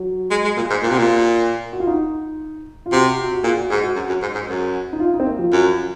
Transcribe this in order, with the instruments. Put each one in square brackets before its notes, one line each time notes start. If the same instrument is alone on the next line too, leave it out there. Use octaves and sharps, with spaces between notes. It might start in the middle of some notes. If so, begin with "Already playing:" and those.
Already playing: [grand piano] F#3
[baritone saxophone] G#3
G#3
A#2
G#2
A#2
C3
A#2
[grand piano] F#4
F4
D#4
F4
[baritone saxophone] C3 [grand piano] F#4
[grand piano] F#4
F#4
[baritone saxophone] A#2 [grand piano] G#4
[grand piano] F#4
[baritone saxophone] G#2 [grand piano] G#4
[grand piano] F#4
[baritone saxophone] F#2
F#2
G#2
G#2
F#2
[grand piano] D#4
F4
D#4
C4
A#3
F3
[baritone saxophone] F#2